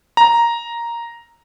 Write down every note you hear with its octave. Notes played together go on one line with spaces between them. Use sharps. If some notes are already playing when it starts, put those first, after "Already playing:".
A#5